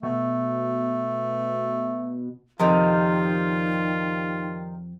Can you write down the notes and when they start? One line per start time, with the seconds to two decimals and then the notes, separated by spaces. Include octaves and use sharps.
0.03 B2 A3
2.60 F2 C3 D#3 G3 D#4 F4